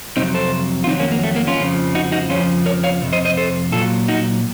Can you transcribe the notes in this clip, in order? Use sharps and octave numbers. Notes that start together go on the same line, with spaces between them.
F2 C3 F#3 C4 D#4
A4 C5
F4
F2 D#3 F#3 C4 D#4
A#3 C#4
A#3
A3
A#3
C#4 F4
F2 C#3 F3
D#4 F#4
D#4 F#4
F2 C#3 F3 C#4 F4
A#4 C#5
C#5 F5
F2 C3
C5 D#5
C5 D#5
A4 C5
A#2 F#3 F4 A4
D#4 F#4